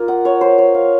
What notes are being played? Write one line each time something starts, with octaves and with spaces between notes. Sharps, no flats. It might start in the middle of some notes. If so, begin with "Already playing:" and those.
Already playing: A#3 F4
F#5
C#5
C5
C#5
F5